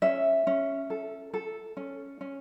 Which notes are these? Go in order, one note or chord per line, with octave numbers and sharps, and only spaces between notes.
C#4 E5
C#4
A4
A4
C#4
C#4